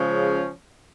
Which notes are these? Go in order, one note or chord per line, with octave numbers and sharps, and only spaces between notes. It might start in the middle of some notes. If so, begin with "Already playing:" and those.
Already playing: C#3 F3 G#3 C#4